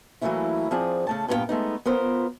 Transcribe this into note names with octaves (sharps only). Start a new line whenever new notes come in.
E3 F#3 A3 A#3 C#4 E4
F3 C4 G#4 D5
C#3 A3 A5
G2 A#2 B3 F4 F5 G5
G#3 A3 B3 D#4
B3 F4 A#4 C5